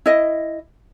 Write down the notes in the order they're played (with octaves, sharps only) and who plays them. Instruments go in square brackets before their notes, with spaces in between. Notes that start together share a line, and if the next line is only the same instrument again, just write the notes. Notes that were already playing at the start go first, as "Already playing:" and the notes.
[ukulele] E4 D#5